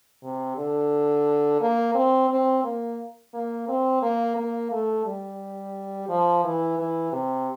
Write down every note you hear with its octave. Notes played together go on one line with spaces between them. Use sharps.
C3
D3
A#3
C4
C4
A#3
A#3
C4
A#3
A#3
A3
G3
F3
E3
E3
C3